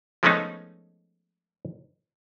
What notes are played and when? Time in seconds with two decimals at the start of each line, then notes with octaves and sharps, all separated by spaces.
0.23 F3 G#3 A3 B3 C#4 D#4